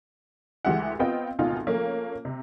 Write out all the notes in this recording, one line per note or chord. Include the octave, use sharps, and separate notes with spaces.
D2 E3 G#3 G4 E5 F#5
B3 C4 F4 D#5 G5
G#1 D2 B2 D#4 F4
F3 A3 A#3 C#4
C3